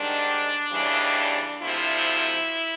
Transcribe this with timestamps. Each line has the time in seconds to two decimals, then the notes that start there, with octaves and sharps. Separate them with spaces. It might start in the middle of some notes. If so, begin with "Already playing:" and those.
Already playing: G#2 D#3 G3 D4
0.71 D#2 C#3 E3 G3
1.63 D2 C3 F3 E4